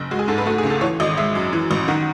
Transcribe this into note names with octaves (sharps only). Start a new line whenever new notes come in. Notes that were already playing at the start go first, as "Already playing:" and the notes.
Already playing: F#1
G#3 F#4
G#4
G#2 A4
B4
A3 F#4
G#4
C#2
A4
E3 C#5
G#1 D#5
G#3 E5
F#2
E3
A1
D#3 F#5